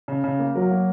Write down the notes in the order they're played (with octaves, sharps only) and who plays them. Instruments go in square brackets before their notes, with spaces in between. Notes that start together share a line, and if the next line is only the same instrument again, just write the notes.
[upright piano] C#3
C#3
A#3
[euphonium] F#3 [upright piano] A#4
[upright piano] A#3